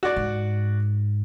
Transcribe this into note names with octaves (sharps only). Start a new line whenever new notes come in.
F#4 D5
G#2